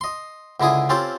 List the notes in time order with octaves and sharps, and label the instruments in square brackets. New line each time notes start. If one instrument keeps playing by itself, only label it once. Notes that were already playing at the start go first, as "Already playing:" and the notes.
[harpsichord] D#5 C6
C#2 D3 E4 G#4 D#6
C4 C#4 F4 G4 A4 C5